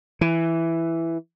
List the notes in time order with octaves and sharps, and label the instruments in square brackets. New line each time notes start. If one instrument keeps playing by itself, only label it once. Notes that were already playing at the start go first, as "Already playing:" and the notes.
[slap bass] E3